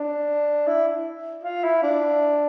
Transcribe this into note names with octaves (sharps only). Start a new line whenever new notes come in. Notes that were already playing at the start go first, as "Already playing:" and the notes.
Already playing: D4
E4
F4
E4
D4